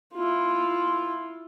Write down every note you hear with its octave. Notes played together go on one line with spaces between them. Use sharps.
E4 F4